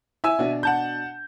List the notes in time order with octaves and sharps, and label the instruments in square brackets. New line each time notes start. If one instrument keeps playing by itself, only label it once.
[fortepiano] E4 [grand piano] E5 G#5 E6
[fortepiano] B2 D4 F#4
[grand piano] F#5 A5 G6